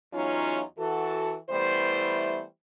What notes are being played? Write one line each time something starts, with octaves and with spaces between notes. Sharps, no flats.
E2 F#3 C#4 D#4 F4
E3 F#4 A4
E3 G3 A3 B3 E4 C5